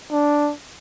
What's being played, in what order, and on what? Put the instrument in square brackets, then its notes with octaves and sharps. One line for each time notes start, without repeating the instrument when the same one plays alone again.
[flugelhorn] D4